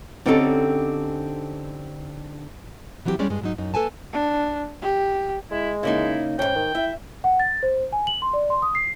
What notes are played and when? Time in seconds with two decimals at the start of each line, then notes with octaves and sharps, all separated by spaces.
0.26 D3 C4 C#4 D#4 G4 A4
3.05 E3 F#3 C4 F4 G4
3.19 G3 G#3 C#4 D5
3.30 G2 G#3
3.42 G#2 F#3 D#4
3.58 F#2 D#4
3.74 A#3 A4 B4 G#5 A5
4.13 D4
4.82 G4
5.51 G#3 E4
5.83 C#3 A#3 D#4 E4
6.39 D2 G#2 C#4 G5
6.56 D#3
6.75 E4 E5
7.24 F#5
7.40 A6
7.63 C5
7.92 G#5
8.07 F#7
8.22 C6
8.33 D5
8.50 C6
8.62 D#6
8.75 C7